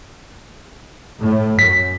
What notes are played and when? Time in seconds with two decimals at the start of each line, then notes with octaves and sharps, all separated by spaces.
1.21 A2
1.59 F#2 B6